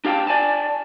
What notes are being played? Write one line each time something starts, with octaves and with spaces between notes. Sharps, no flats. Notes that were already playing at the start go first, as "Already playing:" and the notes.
D4 G4 F5 G5 A5
D5 G#5 A5